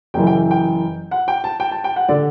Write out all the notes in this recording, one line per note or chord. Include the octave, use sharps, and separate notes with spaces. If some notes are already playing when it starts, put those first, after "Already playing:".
F#1 F#2 E3 G5
G5
G5
F#5
G5
A5
G5
A5
G5
F#5
D3 D5